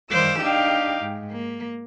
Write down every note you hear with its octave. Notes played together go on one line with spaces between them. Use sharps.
D#3 G3 C5 F5 D6 E6
D4 D#4 G4 F5 G5
G#2
A#3